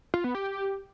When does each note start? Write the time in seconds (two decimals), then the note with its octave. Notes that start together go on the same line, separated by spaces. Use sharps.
0.14 F4
0.24 B3
0.35 G4